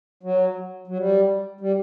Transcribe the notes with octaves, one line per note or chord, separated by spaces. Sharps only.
F#3
F#3
G3
G3